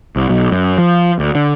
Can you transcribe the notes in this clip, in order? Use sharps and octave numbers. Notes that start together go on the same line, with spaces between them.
C2
B1
F#2
F3
D2
D3